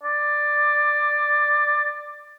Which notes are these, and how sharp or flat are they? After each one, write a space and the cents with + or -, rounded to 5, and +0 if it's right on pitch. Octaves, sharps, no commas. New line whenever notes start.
D5 +10